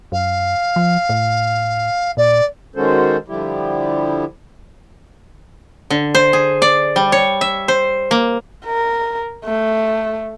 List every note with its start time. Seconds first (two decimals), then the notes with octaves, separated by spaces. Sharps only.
0.12 F#2 F5
0.76 F3
1.09 A2
2.17 A#2 D5
2.76 D#3 G#3 C#4 F#4 A4 C5
3.28 D3 F3 G3 E4 G4
5.90 D3
6.15 C5
6.33 G#4
6.62 D5
6.96 G3
7.12 C#5
7.41 E5
7.68 C5
8.11 A#3
8.66 A#4
9.45 A3